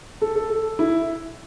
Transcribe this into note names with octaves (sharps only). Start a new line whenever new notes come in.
A4
A4
A4
E4